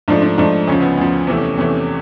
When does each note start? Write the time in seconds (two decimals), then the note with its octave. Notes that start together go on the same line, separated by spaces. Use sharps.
0.08 G#2 F3 A3 D4
0.22 D4
0.38 G#2 F3 A3 D4
0.67 D2 C#3 F3 C#4
0.82 B3
0.97 D2 C#3 F3
1.27 E2 C3 E3 A3 C4
1.37 C#4
1.58 E2 C3 E3 A3 C#4